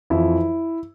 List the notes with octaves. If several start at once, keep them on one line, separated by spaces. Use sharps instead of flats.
F2 E3 E4